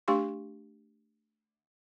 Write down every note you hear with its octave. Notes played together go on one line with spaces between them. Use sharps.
A3 D4 G4 F5 C6 C#6